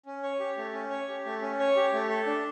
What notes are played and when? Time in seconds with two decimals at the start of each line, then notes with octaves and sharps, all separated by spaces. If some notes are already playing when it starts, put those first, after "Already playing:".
0.06 C#4
0.23 C#5
0.39 G4
0.57 A3
0.73 C#4
0.90 C#5
1.08 G4
1.25 A3
1.42 C#4
1.59 C#5
1.76 G4
1.93 A3
2.09 A4
2.26 D4